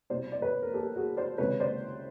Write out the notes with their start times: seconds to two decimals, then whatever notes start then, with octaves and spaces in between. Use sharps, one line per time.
0.10 C2 B2 C5 D5
0.32 D5
0.42 B4 C#5
0.62 A#4
0.74 G4 A4
0.96 F#4 G#4
1.17 C5 D5
1.38 C#2 C3 D#3 B4 C#5
1.60 C5 D5